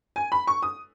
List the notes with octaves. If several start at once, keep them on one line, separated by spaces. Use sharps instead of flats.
G#5
B5
C#6
D#6